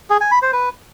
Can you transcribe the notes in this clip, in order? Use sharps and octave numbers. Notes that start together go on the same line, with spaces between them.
G#4
G#5
B5
C5
B4